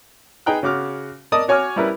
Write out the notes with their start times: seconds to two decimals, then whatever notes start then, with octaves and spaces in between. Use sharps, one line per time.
0.46 D#4 G#4 B4 G5 A#5 F#6
0.63 C#3 F#4 D6 F6
1.32 A#4 D5 D#5 A5 D#6
1.48 F#4 C#5 G#5 C#6 D6 F6
1.76 G3 C#4 E4 A#4 B4